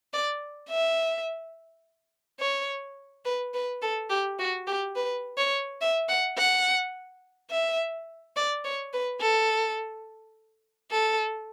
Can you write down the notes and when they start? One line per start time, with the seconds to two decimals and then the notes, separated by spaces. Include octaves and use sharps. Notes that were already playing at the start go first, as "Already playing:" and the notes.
0.14 D5
0.70 E5
2.40 C#5
3.25 B4
3.54 B4
3.82 A4
4.10 G4
4.39 F#4
4.67 G4
4.96 B4
5.38 C#5
5.81 E5
6.09 F#5
6.38 F#5
7.51 E5
8.36 D5
8.65 C#5
8.94 B4
9.21 A4
10.92 A4